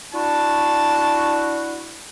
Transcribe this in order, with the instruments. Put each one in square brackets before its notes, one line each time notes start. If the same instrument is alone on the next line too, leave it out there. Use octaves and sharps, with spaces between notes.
[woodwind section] D4 E4 F#4 [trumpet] A5